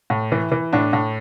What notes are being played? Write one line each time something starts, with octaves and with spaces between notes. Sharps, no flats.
A2
E3
E3
A2 D4
A2